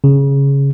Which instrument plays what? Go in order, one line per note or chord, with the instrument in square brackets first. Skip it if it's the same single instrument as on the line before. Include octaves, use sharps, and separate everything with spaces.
[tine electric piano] C#3